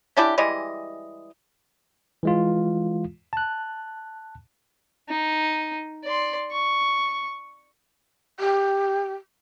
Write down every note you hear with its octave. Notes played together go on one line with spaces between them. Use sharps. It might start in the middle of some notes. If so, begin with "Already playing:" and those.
C#4 D4 E4 G4
E3 G3 G#3 D#5
E3 G#3 F4
A5 F#6
D#4
D5 C6
C#6
G4